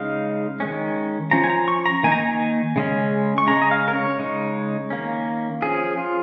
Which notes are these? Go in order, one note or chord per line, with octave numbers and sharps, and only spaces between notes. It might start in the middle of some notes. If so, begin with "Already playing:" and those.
Already playing: C#3 G#3 D#4 F5
D#3 G#3 C#4
F3 C#4 A#5
G#5
A#5
C#6
A#5
D#3 A#3 D#4 G#5
A#5
G#5
C#3 G#3 C#4
C#6
C#3 G#3 C#4 A#5
D#5
F5
A#4
C#5
C#3 G#3 D#4
D#3 A#3 C#4
F3 C#4 G#4
F4